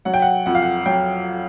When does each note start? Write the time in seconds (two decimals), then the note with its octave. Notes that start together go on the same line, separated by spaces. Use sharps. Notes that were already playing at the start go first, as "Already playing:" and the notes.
0.05 F#3 F#5
0.14 G5
0.22 F#5
0.46 F2 F#5
0.55 F5
0.62 F#5
0.86 F#3 G5